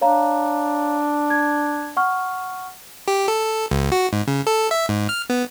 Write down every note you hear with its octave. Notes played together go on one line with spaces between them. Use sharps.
D4 C#5 F5 A#5
G#6
F#5 C#6 F6
G4
A4
C#2
F#4
G#2
C#3
A4
E5
G#2
F6
B3